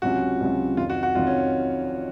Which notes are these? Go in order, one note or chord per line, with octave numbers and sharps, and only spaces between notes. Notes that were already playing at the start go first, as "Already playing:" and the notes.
C#2 C3 F#3 C#4 F4 F#4
C#2 C3 F#3 C#4 F4
F1 F2 D#3 F4
F#4
F#4
F1 F2 D#3 F4
C#4